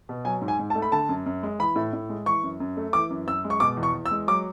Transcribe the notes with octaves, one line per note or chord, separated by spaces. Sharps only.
B2
F#3 G#5
G#2
G#5
G#2
A5
A3
B5
D3 A5
F#2
F#2
G#3
E3 B5
A2
A2
G#3
E3 C#6
F#2
F#2
A3
E3 D6
F#2
F#2 E6
G#3
C#6
B2 D6
E2
C#6
E2
E6
G#3
F#3 D6